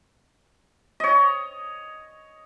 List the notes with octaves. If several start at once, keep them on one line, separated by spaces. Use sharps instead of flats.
C#5 D#5